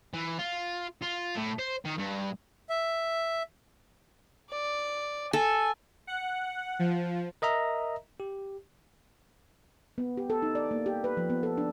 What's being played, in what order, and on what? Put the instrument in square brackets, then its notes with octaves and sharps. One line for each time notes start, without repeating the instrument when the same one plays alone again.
[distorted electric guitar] E3
F4
F4
A2
C5
D#3
G2
[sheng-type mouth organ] E5
[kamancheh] D5
[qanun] A4 [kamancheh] G#5
[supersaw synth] F#5
F3
[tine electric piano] A#4 D#5 E5 A#5
G4
[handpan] B3
G4
A4
D#4
D5
A#3
G4
B4
F3
B3
A4
D4